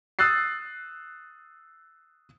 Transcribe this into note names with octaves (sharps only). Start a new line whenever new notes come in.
D#6 E6 F#6 A6 C7